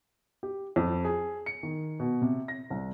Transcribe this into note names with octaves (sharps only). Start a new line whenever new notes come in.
G4
F2
G#4
C#7
D#3
B2
C3
A#6
C2